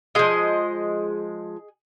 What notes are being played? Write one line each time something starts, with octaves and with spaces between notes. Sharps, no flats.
F3 G#3 G#4 D#5